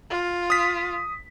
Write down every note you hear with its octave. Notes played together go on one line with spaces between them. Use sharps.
F4
D#6 B6